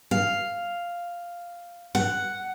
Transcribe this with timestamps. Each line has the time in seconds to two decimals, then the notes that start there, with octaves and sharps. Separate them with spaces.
0.11 F5
1.95 F#5